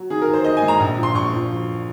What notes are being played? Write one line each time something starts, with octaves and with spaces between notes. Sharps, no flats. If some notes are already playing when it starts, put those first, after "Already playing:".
Already playing: F#3
D#3 G#4
A#4
D#2
C5
D#2 D#5
G#5
G#3
A#5
A#1
F3
C6
A#1 C#6
F3